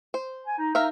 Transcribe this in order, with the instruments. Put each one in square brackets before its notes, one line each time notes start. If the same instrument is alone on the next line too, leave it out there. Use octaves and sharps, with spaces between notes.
[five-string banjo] C5
[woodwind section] G#5
D#4
[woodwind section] D#4 [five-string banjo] A#4 E5 F5